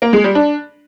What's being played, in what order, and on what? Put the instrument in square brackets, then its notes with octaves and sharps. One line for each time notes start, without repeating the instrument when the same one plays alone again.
[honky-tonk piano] A#3
G#3
G3
D4